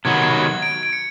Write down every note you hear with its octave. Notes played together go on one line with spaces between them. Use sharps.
C3 D#3 F#3 B3 G#6
G#6
G#6
D7
D7
C#7